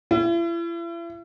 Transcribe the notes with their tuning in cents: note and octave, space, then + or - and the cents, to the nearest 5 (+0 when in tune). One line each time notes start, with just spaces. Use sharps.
E4 +40